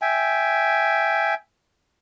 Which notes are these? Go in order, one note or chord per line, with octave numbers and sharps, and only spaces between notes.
E5 G5 G#5